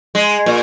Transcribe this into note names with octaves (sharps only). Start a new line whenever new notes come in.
G#3
A#2